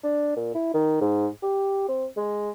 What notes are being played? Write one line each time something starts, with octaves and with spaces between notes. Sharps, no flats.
D4
A#2
E4
D#3
G#2
G4
C4
G#3